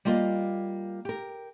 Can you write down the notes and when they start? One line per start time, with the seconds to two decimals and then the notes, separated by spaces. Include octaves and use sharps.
0.05 G3 A#3 F4 D#5
1.05 G4 A#4